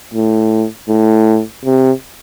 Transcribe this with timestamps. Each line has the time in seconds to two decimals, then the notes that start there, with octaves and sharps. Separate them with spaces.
0.14 A2
0.89 A2
1.65 C3